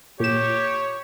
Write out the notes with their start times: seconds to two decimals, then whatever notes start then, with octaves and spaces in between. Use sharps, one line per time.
0.20 A#2 G4 C#5 E7